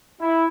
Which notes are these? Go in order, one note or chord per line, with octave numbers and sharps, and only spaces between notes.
E4